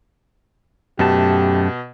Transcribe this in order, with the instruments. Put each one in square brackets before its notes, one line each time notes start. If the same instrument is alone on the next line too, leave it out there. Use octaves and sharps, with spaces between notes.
[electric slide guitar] F#2 A3 A5 [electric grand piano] B2 [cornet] G4